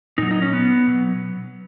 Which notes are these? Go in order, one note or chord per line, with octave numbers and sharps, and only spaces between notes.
A#2 F#3 D#4
D#4
C#4
B3
B2 F#3